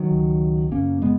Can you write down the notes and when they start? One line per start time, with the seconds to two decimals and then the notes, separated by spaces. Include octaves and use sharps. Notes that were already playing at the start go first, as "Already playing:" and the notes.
Already playing: D#3 F#3
0.11 C#2 C#3
0.72 F#2 C#3 A#3 C#4
1.02 G#3 B3